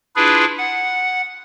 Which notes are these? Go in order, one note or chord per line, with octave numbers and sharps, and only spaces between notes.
D4 E4 F4 G#4 B4
F#5